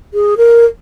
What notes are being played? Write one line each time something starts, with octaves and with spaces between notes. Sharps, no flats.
G#4
A#4